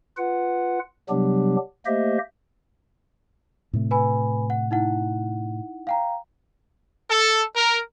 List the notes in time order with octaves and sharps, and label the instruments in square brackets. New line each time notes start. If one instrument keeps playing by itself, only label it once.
[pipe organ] F4 B4 F#5
C3 F#3 G3 B3 D4 G4
A3 A#3 G4 C5 D#5 E5
[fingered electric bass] A2 C3 A3
[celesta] B4 G#5 B5
F#5
D#4 E4 F#5
F5 G5 A#5
[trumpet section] A4
A#4